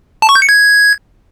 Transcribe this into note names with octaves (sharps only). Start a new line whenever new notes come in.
A5
C#6
G6
C#7
G#6